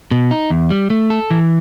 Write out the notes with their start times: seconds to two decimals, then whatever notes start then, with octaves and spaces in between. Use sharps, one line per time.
0.11 B2
0.31 D#4
0.50 E2
0.70 G3
0.90 A3
1.10 A4
1.31 E3